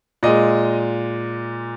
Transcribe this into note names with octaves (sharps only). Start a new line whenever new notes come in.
A#2 G#3 D#5